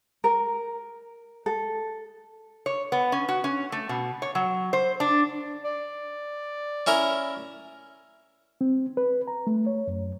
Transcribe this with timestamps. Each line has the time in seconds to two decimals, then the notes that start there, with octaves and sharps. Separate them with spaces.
0.24 A#4
1.46 A4
2.66 C#5
2.92 B3
3.12 C#4
3.29 F#4
3.44 C#4
3.72 A3
3.89 B2
4.22 C#5
4.35 F#3
4.73 C5
5.00 D4
5.65 D5
6.87 C#4 E4 A#4
8.61 C4
8.97 B4
9.27 A#5
9.47 A3
9.67 C#5
9.87 F#2